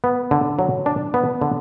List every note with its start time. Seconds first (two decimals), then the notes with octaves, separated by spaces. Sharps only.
0.04 B3
0.31 D3
0.59 F#3
0.86 D4
1.14 B3
1.41 D3